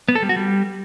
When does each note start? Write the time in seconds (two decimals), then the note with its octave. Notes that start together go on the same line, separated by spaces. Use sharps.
0.09 B3
0.15 A4
0.22 G3
0.29 F#4
0.36 G3